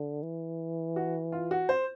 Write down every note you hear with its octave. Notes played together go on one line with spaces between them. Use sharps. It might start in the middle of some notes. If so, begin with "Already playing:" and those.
Already playing: D3
E3
F#4
F4
F#4
C5